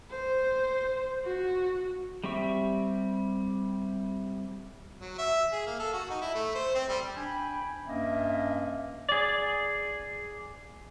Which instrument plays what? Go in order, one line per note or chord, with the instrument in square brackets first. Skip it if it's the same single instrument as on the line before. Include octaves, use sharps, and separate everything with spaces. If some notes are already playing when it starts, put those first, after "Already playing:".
[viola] C5
F#4
[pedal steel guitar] G3 C4 G4 E5 C#6
[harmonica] F#3
E5
G#4
A#3
A4
F#4
D#4
E4
A3
C5
C4
G3
[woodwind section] D4 G5 G#5 B5
G2 A#3 C#4 D#5 E5
[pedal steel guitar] G#4 D5